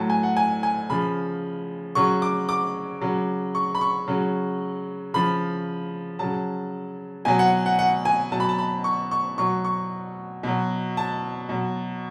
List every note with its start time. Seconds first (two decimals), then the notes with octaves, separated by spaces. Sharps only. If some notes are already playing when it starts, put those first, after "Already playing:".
Already playing: A2 F#3 A5
0.10 G#5
0.23 F#5
0.36 G#5
0.63 G#5
0.90 C#3 F3 B5
1.95 C#3 F#3 C#6
2.22 D6
2.49 D6
3.01 C#3 F#3
3.55 C#6
3.75 B5
3.81 C#6
4.08 C#3 F#3
5.14 C#3 F3 B5
6.19 C#3 F#3 A5
7.25 B2 F#3 G#5
7.39 F#5
7.66 F#5
7.79 F#5
8.05 G#5
8.32 B2 F#3 A5
8.40 B5
8.49 A5
8.58 B5
8.84 C#6
9.11 C#6
9.38 B2 F#3 C#6
9.65 C#6
10.43 B2 F#3
10.97 A5
11.49 B2 F#3